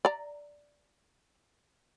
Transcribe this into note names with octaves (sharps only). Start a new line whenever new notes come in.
D5 A#5